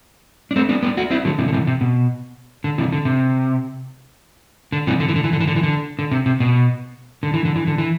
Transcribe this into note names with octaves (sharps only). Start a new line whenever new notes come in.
D4
A3 C4
B3 D4
B3 D4
D4 F#4
C4 E4
D3 F#3
C3 E3
D3
C3 E3
C3
B2
D3
C3 E3
D3
C3
D3
C3 E3
D3
E3
D3
E3
D3
E3
D3
E3
D3
D3
C3
C3
B2
D3
E3
D3
E3
D3
E3